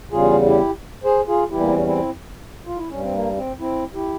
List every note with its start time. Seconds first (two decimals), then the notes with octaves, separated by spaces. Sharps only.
0.12 E2 C#3 G3 F4 G#4
0.46 E4 G4
1.04 G#4 C5
1.27 F4 G#4
1.50 E2 E3 G3 E4 G4
1.60 A#3
1.68 C4
1.77 C#4
1.86 C4 E4
2.66 F4
2.77 E4
2.89 G2 G3 C#4
3.01 C4
3.13 A#3
3.36 C4
3.60 C4 E4
3.94 E4 G4